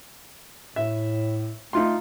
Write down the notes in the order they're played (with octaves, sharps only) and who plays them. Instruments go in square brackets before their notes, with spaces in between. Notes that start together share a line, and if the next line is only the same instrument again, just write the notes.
[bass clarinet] A2 [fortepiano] E5
[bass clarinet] A3 [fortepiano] D#4 F4 C6